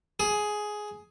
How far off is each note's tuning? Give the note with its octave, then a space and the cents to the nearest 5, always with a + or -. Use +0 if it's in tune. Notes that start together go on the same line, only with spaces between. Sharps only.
G#4 +10